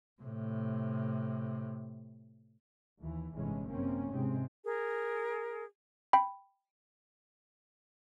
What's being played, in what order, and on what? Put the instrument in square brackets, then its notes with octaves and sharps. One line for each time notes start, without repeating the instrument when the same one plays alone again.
[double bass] A2 C3
[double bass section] D#2 E3
G1 A2 C3 E3 G#3 C#4
F#2 C3 A#3 C4 C#4
G#2 C3 G#3 C4
[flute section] G#4 A#4
[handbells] G5 B5